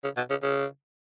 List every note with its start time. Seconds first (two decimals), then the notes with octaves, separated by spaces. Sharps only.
0.04 C#3
0.17 B2
0.30 C#3
0.43 C#3